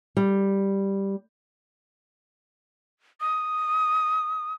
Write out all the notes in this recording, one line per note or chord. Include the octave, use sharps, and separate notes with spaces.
G3
D#6